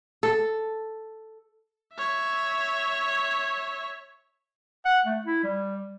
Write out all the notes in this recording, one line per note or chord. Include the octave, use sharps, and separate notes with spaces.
A4
C#5 E5
F#5
A3
E4
G3